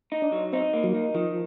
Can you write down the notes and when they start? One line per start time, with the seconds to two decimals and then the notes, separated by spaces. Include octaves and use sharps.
0.12 D#4
0.22 D4
0.32 F#3
0.53 C4 D#4
0.73 A#3
0.84 F#3
0.94 D#4
1.15 D#3 F3